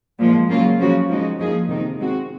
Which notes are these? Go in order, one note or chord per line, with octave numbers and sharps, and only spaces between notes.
A#2 F3 G#3
C#3 F#3 A#3 F4
C#3 F3 A#3 C#4 F#4
F3 G#3 D#4 F#4
F3 A#3 D#4 G#4
C3 D#3 A#3 D#4
G#3 C4 F#4